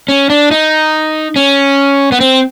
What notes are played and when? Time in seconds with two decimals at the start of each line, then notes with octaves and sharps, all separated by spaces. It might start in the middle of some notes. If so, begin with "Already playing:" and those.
0.09 C#4
0.30 D4
0.51 D#4
1.36 C#4
2.12 B3
2.20 C4